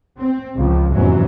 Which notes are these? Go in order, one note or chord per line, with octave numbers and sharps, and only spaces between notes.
C4
C#2 F3
F1 E2 G#2 E3 F#3 C#4